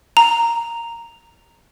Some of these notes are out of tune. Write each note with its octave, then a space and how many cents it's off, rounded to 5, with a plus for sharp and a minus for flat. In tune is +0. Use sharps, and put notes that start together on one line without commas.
A#5 -5